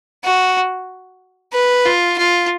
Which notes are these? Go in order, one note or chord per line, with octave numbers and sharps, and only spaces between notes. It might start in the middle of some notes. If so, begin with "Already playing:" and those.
F#4
B4
F4
F4